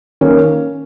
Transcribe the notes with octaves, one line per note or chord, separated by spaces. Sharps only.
D#3 A#3 C#4